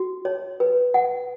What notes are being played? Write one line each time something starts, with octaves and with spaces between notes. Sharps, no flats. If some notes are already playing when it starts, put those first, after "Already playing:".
Already playing: F#4
C#5
B4
F#5